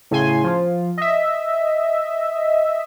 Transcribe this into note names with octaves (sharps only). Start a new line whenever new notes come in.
A2 C#3 G#5 C6
F3 F4
D#5 E5